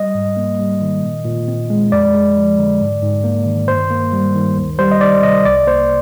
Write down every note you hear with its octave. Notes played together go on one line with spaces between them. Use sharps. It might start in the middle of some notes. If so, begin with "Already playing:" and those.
Already playing: G3 D#5
G#2
A#3
G3
D#3
A#2
A#2
C4
G#3
F2 D5
G#3
F3
D3
G#2
G#2
A#3
D#3
G2 C5
A#3
G3
D#3
D2
G3 C5
D#5
D#3 D5
C3 D#5
C2 D5
A#3 C5